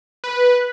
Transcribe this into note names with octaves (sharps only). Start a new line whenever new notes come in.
B4